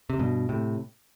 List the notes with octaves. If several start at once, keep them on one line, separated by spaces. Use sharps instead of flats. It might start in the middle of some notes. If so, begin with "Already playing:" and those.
C3
G2 B2
A2 C3